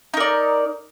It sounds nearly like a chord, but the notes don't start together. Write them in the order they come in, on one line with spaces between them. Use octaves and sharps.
D#4 A#4 D5